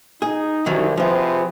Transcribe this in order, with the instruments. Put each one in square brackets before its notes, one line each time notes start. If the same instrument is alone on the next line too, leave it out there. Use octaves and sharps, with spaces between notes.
[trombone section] D#4 [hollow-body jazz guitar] G#4
[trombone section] C2 [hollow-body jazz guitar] F#2 D#3 E3
[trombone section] C3 G#4 B4 [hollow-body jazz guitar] F3 F4